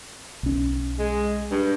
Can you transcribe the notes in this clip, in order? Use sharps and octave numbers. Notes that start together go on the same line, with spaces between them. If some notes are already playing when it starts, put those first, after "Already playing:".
B1 C#4
G#3
G2